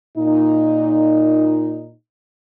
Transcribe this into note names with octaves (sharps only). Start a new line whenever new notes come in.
A#2 D#4